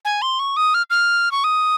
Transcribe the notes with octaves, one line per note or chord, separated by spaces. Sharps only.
G#5
C6
C#6
D#6
F6
F6
C#6
D#6